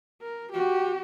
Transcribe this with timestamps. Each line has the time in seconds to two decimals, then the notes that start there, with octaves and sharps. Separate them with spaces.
0.22 A#4
0.52 F#4 G4